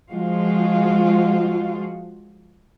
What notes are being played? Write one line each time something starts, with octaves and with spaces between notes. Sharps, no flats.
F3 G#3 F4 F#4